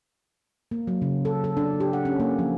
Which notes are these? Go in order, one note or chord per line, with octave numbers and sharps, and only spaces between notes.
A#3
F#3
C#3
A4
A4
D4
G4
F#5
C#4
A#3
F3